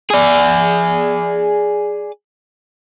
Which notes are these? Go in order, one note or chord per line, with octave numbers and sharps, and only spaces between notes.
G#4 D5